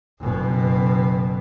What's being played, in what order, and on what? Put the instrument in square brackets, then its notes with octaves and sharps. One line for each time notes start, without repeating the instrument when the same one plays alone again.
[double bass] F#1 B2